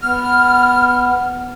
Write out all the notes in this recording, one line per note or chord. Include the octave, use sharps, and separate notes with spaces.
B3 F6